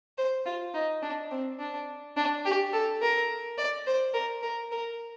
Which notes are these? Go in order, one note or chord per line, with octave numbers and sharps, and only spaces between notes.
C5
F4
D#4
D4
C4
D4
D4
G4
A4
A#4
D5
C5
A#4
A#4
A#4